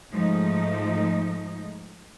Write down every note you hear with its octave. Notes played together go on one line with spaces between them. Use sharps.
G#2 F3 G#3 A3 D#4